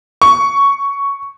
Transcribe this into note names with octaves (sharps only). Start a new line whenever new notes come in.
C#6